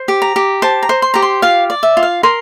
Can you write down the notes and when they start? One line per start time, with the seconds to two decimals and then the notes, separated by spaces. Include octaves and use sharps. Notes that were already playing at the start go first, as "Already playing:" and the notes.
Already playing: C5
0.08 G4
0.22 A#5
0.36 G4
0.62 C5 A5
0.83 A#5
0.89 C5
1.02 C6
1.14 G4 A#5
1.22 C6
1.42 F4 F5
1.70 D5
1.83 E5
1.97 F4
2.03 F5
2.23 A#4 C6